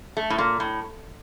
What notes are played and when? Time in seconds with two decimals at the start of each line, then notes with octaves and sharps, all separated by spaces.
0.17 A3
0.30 A2
0.38 A#2
0.60 A2